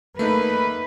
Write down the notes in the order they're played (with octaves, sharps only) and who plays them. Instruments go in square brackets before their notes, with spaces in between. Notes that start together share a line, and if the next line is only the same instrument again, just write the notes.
[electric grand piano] A3 A#3 D#4 [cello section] B4